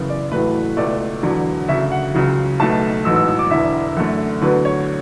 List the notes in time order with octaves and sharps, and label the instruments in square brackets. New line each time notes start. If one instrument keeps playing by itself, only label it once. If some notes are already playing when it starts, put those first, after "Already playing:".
Already playing: [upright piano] F#2 C#3 E3 B3
D5
A1 A2 F#3 A3 B4
C#2 B2 A3 D5
E1 E2 D3 F#3
D2 C#3 F#3 E5
F#5
C#2 C#3 F#3
B1 B2 A3 A5
A1 G#2 F#3 B3 E6
E6
E6
D6
E1 E2 D3 E5
F#2 D3 A3
D2 D3 F#3 B3 B4
C#5